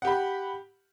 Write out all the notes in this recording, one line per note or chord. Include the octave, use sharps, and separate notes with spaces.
G4 F#5 B5